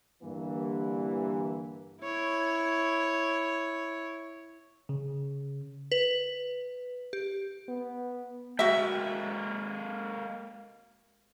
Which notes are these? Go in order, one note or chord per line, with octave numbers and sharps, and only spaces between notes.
G2 D3 E3 A#3
E4 C#5
C#3
B4
G4
B3
G#3 A#3 F#4 E5 G5